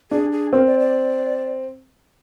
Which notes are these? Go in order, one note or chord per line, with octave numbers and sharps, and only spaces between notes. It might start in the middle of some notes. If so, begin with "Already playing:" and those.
D4 G#4
G#4
C4 A#4
D5
D5